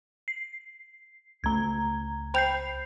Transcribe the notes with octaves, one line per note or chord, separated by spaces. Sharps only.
C7
C#2 A3 A#5 G#6
C5 G5 B5 G6 C7 F7